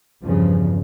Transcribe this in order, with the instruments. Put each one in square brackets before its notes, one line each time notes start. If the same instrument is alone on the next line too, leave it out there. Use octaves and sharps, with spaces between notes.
[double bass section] E2 G2 C#3 F3